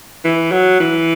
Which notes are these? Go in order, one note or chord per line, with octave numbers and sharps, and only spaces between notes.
E3
F#3
E3